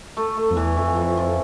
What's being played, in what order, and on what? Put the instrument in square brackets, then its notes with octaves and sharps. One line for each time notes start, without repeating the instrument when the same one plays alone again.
[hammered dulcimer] A3
A3
[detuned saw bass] F2
[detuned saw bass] E2 [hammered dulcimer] E3
[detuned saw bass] F2 [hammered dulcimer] E3
[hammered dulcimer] F3
F3